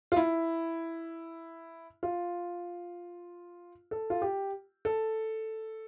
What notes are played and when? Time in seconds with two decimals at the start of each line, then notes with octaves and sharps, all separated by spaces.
0.12 F4
0.16 E4
2.03 F4
3.91 A4
4.10 F4
4.22 G4
4.85 A4